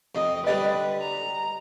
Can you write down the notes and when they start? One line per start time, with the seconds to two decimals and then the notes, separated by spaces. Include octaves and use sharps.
0.15 F2 D#5
0.47 D3 G3 B4 D#5
1.01 A#5